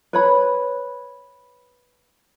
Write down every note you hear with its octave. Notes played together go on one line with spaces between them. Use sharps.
B4 C#5 B5